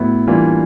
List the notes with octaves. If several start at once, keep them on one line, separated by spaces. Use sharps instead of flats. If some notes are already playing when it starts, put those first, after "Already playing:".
Already playing: A2 F#3 B3 E4
E3 G3 A#3 D4 F4